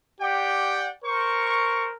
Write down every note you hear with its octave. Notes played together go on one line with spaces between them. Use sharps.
G4 D5 F#5 G5
A#4 C5 C#6